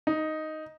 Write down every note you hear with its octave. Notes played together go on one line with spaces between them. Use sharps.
D#4